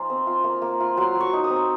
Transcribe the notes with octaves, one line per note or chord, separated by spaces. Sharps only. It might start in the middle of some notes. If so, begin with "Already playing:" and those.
Already playing: F3 A#3 D#4 F4 G#5
C4
F4
A#3
A#3
F4
F#3 C6
F#3
C#6
D#4
D#6
C4